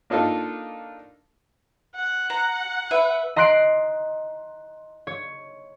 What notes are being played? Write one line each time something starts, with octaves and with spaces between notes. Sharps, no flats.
A#3 D4 D#4 F4 A4
F#5
A#5
B4 E5
D#5 A#5 C6 F#6 C7 D7
C#5